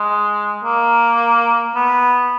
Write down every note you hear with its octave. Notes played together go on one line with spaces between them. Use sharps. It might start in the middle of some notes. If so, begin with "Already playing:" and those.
Already playing: G#3
A#3
B3